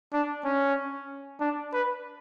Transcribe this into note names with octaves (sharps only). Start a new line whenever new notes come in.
D4
C#4
D4
B4